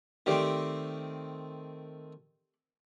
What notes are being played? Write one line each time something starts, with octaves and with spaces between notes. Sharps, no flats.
D#3 A3 C4 G4 D5